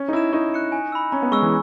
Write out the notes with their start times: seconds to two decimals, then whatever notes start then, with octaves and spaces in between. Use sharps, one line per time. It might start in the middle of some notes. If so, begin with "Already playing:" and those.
Already playing: C#4
0.08 D#4
0.13 E4 A#6 E7
0.33 D#4 C#6
0.53 F#6 C#7 E7
0.72 G#5
0.92 B5 E6
1.12 C#4 A#5
1.22 B3
1.32 G#3 C#6 E6
1.42 E3